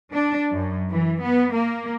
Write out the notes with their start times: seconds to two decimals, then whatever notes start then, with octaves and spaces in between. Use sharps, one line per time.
0.14 D4
0.53 F#2
0.91 E3
1.24 B3
1.54 A#3